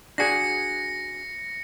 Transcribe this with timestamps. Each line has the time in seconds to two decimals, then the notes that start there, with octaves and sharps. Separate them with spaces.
0.18 D4 F#4 G#4 A#6 C#7